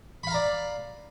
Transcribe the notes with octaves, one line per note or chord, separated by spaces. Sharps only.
D5 F5 A#5 B5